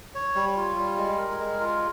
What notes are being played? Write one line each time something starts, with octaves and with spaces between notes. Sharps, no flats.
C#5
G3
F4
G3
G#3
A#4
G#3
F4